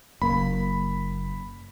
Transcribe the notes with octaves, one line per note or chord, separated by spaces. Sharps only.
F#1 A#3 B5